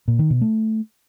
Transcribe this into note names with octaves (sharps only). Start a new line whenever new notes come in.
A#2
D#3
B2
A3